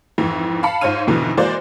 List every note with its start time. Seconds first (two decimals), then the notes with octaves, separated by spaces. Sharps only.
0.18 F2 G#2 E3
0.63 F5 A5 B5 C#7
0.81 G#2 F4 C5 C#5 F6 D#7
1.07 F2 G#2 B2 D3 E3
1.37 E3 G#3 A#3 F#4 C5 D5